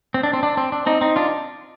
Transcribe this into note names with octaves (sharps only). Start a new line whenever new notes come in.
C4
D4
C4
D4
C4
D4
C4 D#4
C4 D#4
D4 F4